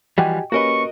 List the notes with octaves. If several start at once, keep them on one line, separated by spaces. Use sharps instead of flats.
E3 F3 G3 F#4 G4 D#5 G5 G#5
A#3 C#4 F#4 G4 A#4 B4 D#5 C#6